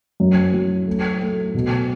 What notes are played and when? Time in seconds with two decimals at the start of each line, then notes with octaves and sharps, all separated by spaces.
0.20 F#2
0.53 F#3
0.87 A3
1.21 A3
1.54 B2